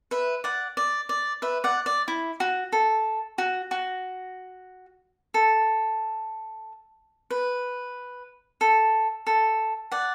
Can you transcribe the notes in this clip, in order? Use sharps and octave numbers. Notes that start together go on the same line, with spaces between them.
B4 E5
D5 F#5
D5
D5
B4 E5
D5 F#5
D5
E4
F#4
A4
F#4
F#4
A4
B4
A4
A4
D5 F#5